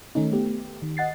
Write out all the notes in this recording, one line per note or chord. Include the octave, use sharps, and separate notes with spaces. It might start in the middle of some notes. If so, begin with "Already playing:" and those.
D#3 A3 C#4 D#4
A3 B3 G4
D#3
D#5 F#5 A6 C7